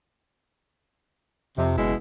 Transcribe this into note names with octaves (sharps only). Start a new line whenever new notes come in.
F2 C3
F#1 B2 G#3 E4